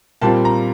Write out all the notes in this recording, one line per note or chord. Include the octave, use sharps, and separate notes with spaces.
A#2 G3 C4 F4 A5
A#5